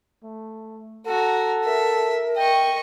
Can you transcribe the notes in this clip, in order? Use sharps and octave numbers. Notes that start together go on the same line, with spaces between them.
A3
F#4 A4 A#5
A#4 E5
D#5 G5 C#6